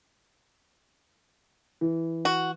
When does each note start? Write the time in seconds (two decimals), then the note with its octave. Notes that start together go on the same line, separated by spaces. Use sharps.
1.81 E3
2.25 F#4